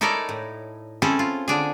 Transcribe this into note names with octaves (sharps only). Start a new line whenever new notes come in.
D#4 E4 A4 A#4 C#5 D5
A2
C4 C#4 E4 G#4 A4
F4
D3 D4 G#4